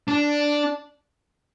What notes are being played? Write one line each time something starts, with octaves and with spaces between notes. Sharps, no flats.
D4